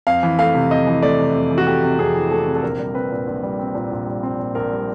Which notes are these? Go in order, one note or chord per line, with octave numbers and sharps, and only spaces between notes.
F2 F5
E3
A3 F5
C3
F2 D#5
E3
A3 D5
C3
F2
E3
F#4
A3 G4
C3
F2 G#4
E3
A3 A4
C3
A4
A#1 A#4
G3
C4 B4
A#2
A#1
G3
C4
A#2
A#1
G3
C4
A#2
A#1 A#4
G3